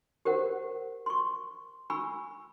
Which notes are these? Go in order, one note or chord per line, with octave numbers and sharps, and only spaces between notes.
G4 A#4 C5 F#5
C6 C#6
G#5 B5 C#6 E6